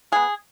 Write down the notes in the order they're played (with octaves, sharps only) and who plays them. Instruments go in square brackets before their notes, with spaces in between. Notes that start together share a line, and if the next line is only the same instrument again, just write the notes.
[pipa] G#3 B3 G#4